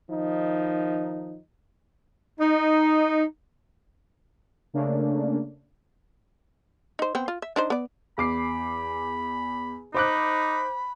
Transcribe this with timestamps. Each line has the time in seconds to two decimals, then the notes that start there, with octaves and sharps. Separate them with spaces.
0.10 D#3 F3 D#4
2.40 D#4
4.74 C#3 A3 A#3 D4
6.99 D#4 C5
7.15 B3 C4
7.28 F4
7.42 E5
7.56 D4 D#4 C5
7.70 B3 D5
8.18 E2 B5 D6 C7
9.94 D#4 C5 B5 D6 F#6